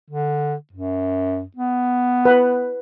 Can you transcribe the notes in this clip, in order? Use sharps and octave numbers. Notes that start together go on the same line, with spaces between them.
D3
F#2
B3
B4 F#5